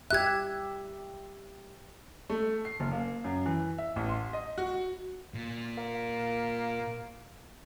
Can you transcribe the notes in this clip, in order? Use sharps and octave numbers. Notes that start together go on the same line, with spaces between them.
G4 E5 F#6 G#6
A3
C7
F#1
A#3
F#2
E3
E5
A1
C6
D#5
F#4
A#2
A#3